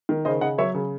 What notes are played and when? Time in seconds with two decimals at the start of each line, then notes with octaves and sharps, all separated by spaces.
0.09 D#3
0.25 C#3 C5 D#5
0.41 C#3 D#5 F#5
0.58 F#3 C#5 E5
0.74 C#3